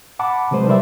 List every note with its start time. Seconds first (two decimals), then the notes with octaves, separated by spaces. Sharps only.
0.19 F#5 A5 B5 D6
0.51 C3 F#3 G#3 B4 C5
0.67 G3 D#4 A#4 C5 D5 E5